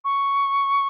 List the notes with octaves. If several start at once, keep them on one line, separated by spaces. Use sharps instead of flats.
C#6